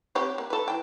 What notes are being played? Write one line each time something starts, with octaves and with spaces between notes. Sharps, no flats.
C4 G4 C#5
A#3
A4 B4
E3 G5